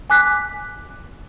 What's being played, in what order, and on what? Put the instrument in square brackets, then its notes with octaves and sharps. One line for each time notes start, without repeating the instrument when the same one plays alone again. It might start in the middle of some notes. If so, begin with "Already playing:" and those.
[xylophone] G#5 D6 F#6 B6